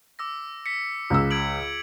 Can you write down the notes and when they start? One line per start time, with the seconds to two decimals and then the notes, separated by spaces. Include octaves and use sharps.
0.19 D6 E6 A#6
0.66 B6 C#7
1.10 C#2 E6
1.31 G#6 D7 F#7